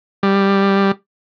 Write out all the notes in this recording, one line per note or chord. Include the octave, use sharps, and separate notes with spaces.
G3